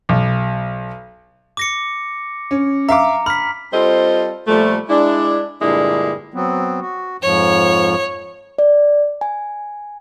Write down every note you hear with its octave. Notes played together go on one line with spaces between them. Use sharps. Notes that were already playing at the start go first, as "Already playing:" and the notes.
B1
D6 A#6 C#7
C#4
E5 F5 A#5 D6
B5 F6 B6
G3 C4 F4 A4 C5 D#5
A#2 F3 G3 A3
G#3 D4 E4
G2 A#2 D3 G#3 D4 E4
F#3 B3 C4
F#4
F2 G#2 F3 C#5
D5
G#5